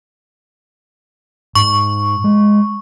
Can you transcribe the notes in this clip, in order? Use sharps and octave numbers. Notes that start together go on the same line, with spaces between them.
G#2 C#6
G#3